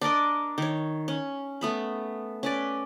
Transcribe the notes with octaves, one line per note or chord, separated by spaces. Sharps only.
D4 A#4 D5 D#5
D#3 C#5
C#4
A3 B3 B5
C#4 B4 D5